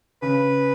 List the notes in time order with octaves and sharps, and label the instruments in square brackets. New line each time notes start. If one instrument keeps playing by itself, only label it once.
[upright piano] C#3 [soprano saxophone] B4